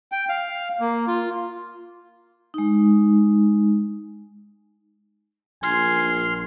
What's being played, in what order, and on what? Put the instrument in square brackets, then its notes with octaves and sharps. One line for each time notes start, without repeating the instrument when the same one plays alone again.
[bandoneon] G5
F5
A#3
F4
[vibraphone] G#3 D#4
[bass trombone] A#1 [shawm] G#5 [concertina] C6 F6 [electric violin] C7